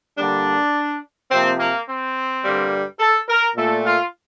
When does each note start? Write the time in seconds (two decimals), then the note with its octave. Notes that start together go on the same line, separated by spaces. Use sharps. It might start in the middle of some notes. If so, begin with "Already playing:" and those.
0.18 D3 G3 A#3 D4
1.31 C3 F3 A#3 C4
1.59 A#3
1.87 C4
2.43 G2 D3 G3 A#3
2.99 A4
3.28 A#4
3.56 A#2 A3 A4
3.84 F4